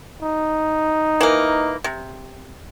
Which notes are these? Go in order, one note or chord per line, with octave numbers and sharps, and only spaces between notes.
D#4
E3 A#3
C3